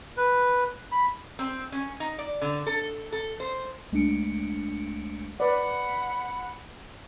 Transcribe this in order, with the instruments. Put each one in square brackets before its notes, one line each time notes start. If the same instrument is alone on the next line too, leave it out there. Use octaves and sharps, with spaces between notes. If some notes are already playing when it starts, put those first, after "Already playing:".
[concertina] B4
B5
[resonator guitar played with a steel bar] C4
C#4
D#4
D5
D3
A4
A4
C5
[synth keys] C#2 G#3 A3 D4 C#7 D7
[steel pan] B4 D5 [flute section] F#5 B5